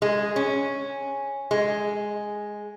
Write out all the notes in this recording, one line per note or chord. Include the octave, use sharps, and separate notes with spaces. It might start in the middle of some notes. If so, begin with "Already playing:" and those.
G#3
C#4
G#3